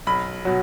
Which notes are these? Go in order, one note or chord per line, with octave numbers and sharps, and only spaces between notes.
B1 B5
B2 F#3